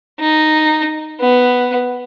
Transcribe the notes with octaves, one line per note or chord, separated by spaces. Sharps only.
D#4
B3